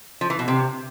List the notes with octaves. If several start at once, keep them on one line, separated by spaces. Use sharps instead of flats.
F3
E3
B2
C3